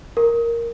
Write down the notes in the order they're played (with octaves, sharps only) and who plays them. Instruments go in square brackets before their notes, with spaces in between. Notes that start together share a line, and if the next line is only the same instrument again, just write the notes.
[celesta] A#4